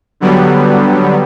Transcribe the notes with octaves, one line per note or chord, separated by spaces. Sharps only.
D3 F#3 G3 B3